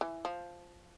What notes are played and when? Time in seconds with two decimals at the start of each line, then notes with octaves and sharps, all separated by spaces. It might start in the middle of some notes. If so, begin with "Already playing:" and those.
0.01 E3
0.25 F3